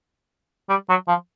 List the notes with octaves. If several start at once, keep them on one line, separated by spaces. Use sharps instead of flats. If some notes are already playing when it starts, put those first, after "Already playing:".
G3
F#3
F3